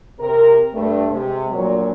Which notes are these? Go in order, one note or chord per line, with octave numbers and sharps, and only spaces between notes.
C3 A#4
G2 A3
C3 G#3
D2 A#2 F3 F#3